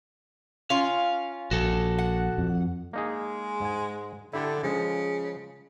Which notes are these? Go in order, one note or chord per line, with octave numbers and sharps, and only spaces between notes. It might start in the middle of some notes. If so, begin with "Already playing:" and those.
C#4 F4 F5
A#1 F#4 A4
F#5
F2
G#3 A#3 D#4 G#4
G#2 G#5
D3 E4 G4 A4
C#3 F3 G#3